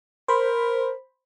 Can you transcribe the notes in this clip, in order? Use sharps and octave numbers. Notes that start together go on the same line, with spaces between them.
A#4 C5 B5